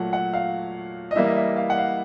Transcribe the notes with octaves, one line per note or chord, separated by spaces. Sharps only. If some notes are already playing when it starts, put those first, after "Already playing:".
Already playing: A#2 F#3 A3 F#5
F#5
F5
D#5
E3 G3 A#3 E5
D#5
E5
F5
F#5
F5